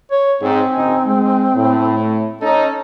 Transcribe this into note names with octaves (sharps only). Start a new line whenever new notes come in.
C#5
G#2 C4
F#1 D#4 G#5
G#3
A2
C#4 D#4 A4